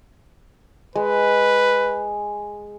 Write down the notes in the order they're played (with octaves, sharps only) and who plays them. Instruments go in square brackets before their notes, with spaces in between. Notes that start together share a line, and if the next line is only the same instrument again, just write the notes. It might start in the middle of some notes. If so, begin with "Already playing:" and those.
[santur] G#3 [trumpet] B4